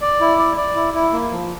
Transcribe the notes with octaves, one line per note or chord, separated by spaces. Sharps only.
D5
E4
D5
D5
E4
E4
A#3
F3